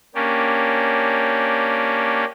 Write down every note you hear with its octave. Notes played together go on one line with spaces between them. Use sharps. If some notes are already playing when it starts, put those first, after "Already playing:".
A#3 C#4 D4 G4